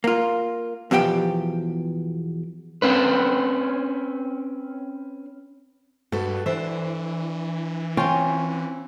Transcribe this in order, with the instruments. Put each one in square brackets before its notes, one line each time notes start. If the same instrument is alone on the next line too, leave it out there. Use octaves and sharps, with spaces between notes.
[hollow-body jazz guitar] A#3 F4
E2 B2 F3 G4 G5
[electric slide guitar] C4 C#4 B4
[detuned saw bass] G2 [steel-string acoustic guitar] F#4 A4 B4
[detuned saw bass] E3 [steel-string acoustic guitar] D4 C5 [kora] E5
[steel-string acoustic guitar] C4 G#5 [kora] C#4 F4 G5